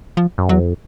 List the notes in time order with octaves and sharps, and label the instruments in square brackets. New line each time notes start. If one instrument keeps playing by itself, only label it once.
[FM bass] F3
[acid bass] F#2
[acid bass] E2 [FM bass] F#3
[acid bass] F2